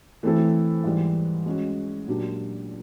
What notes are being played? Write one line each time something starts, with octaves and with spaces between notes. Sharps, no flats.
E3 A3 C4 E4 A4
G#2 E3 G3
G#3 C#4 F#4
A#2 F#3 A#3 D4 G4